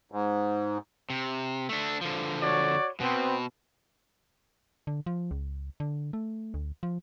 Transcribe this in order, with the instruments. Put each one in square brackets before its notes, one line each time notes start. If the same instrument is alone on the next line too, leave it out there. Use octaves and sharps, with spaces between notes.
[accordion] G#2
[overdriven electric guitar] C3
A3 D4
D3 F3
[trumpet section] F#4 C#5 D5
[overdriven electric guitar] B2 [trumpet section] B3 C4
[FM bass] D3
F3
C#2
D3
A3
D2
F3